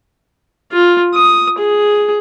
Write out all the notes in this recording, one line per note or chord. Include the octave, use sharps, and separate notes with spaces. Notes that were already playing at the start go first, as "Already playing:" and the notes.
F4
D#6
G#4